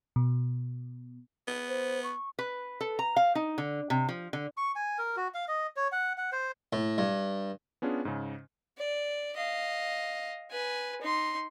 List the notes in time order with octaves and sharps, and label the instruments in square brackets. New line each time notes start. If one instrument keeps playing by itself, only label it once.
[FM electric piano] B2
[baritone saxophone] B3
[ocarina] C5
C#6
[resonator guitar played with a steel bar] B4
A4
A#5
F5
D#4
D3
C3
F3
D3
[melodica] C#6
G#5
A#4
F#4
F5
D#5
C#5
F#5
F#5
C5
[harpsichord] A2
G2
[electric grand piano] B3 C#4 D4 F4 G#4
G#2 C#3
[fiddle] D5
D#5 F5
B4 G#5
D#4 C6